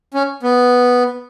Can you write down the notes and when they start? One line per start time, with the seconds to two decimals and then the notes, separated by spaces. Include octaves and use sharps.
0.14 C#4
0.43 B3